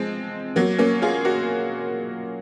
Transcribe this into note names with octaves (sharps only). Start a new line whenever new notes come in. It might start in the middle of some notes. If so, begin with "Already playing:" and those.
Already playing: F3 G#3 C4
F#3 A#3
A#3 C#4
F4 G#4
F#4 A#4